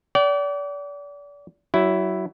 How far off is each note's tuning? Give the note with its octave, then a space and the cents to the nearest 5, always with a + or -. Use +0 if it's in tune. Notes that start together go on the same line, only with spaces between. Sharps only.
D5 -35 G5 -45
F#3 +25 E4 +0